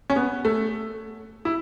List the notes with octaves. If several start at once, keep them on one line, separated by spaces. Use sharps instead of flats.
C#4
B3
A3
E4